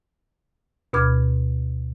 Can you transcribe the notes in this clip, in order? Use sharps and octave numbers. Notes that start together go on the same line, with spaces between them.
D2 B2 B5 D6 F6 G#6